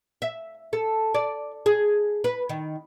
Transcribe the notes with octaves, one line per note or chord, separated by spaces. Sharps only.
E5
A4
D5
G#4
B4
D#3